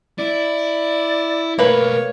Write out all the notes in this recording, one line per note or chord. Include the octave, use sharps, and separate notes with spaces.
E4 D5
B2 A3 A#3 A#4 B4 C#5